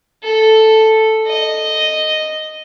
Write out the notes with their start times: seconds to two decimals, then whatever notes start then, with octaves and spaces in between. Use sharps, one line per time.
0.23 A4
1.27 D#5